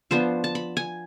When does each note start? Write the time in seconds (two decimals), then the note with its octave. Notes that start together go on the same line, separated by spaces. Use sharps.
0.11 F3 B3 D4 C5
0.44 A5
0.55 B5
0.77 G#5